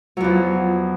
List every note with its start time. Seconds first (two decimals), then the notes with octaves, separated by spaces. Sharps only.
0.17 F#3
0.20 E2
0.24 F3